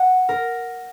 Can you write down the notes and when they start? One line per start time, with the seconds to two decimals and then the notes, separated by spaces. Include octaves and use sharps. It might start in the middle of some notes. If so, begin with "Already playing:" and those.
Already playing: F#5
0.29 A#4